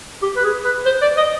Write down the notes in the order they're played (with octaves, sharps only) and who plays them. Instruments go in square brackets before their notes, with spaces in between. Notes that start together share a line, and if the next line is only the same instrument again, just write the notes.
[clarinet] G4
B4
G#4
B4
C5
D5
D#5